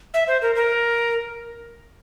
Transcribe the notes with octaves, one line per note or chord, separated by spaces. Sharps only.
E5
C5
A#4
A#4